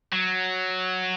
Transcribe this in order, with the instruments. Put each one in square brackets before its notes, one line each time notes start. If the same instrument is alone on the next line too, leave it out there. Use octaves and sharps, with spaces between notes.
[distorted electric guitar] F#3